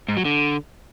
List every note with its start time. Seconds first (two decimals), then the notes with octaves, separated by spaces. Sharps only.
0.08 G#2
0.17 F#3
0.25 D3